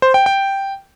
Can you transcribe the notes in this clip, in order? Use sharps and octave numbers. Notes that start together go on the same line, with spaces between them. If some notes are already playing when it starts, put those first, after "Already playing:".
C5
G5
G5